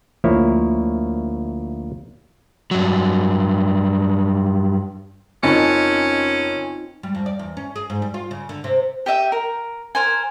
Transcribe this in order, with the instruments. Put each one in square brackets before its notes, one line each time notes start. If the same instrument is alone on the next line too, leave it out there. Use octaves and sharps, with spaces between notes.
[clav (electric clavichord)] D2 F3 A#3 E4 C#5
[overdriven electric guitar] G2 F#3
[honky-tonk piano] F#1 [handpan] C4 D#4 F4 [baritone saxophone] C#4
[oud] G3
F2
D5
E2
C#4
G#4
G#2
G3
F4
C#3
D3
C3
[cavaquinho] G4 D#5 E5 G5
A#4
A#4 C5 G#5